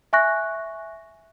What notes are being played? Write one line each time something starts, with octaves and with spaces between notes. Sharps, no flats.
E5 G#5 C#6 F#6 A#6